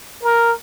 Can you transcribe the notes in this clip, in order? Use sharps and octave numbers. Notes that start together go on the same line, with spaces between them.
A#4